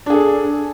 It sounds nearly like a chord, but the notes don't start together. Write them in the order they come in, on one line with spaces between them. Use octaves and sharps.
D4 G#4 A4